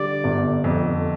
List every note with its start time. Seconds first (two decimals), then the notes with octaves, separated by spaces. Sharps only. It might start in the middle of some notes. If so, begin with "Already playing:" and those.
Already playing: D3 G3 D5
0.24 G1
0.64 F2